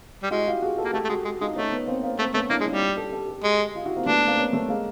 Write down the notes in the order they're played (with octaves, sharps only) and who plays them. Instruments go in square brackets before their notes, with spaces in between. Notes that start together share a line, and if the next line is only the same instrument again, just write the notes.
[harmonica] G3
[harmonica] G#3 [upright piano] E4 F#4
[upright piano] F4 G4
F#4 G#4
G4 A4
[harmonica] A#3
[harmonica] A3 [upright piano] G4 A4
[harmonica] A3
[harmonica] G#3 [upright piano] F#4 G#4
[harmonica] G#3
[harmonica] G#3 [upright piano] D#4 F4
[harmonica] A3 [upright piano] C#4 D#4
[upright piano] B3 C#4
A#3 C4
A#3 C4
[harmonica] A3 [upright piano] A#3 C4
[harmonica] A3 [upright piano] B3 C#4
[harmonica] A#3 [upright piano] D4 E4
[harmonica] G#3
[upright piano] D#4 F4
[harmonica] G3
[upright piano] G4 A4
G4 A4
G4 A4
[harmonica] G#3
[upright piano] F4 G4
E4 F#4
A#3 C4
[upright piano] A3 B3 [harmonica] D4
[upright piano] A#3 C4
B3 C#4
A3 B3
G#3 A#3